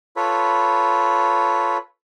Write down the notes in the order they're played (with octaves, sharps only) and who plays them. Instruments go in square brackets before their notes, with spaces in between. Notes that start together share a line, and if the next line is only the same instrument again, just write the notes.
[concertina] F4 A4 B4 C#5 B5